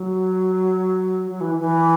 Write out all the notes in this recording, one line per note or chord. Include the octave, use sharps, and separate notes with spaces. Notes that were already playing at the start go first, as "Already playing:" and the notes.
Already playing: F#3
F#3
E3
E3